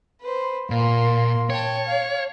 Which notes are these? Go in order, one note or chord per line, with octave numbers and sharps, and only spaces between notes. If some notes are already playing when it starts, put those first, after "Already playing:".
B4 C5
A#2 A#3 C6
C#5 G5 A5
F5